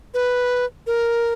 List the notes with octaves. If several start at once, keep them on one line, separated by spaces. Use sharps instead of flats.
B4
A#4